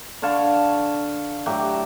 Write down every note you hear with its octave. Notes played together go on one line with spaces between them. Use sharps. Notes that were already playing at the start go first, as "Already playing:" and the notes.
D3 C#5 F5 A5
A2 F#3 G4 E5